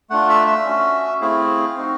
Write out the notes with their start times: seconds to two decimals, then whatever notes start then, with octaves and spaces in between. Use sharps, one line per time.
0.10 A3 D4 F4 F#5
0.29 E5
0.47 E5
0.65 C#4 F#4
1.21 A3 C4 E4 G#4 F5
1.76 C4 D#4 F#4